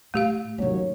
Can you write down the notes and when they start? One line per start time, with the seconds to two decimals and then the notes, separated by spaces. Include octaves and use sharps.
0.14 A2 A3 G4 F5
0.58 D#2 C#3 F#3 A#3 C#5